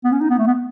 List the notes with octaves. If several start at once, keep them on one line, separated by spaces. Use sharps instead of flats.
B3
C#4
D#4
B3
A3
B3